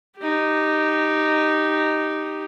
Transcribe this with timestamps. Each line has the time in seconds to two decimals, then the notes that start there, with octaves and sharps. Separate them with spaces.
0.18 D#4 G4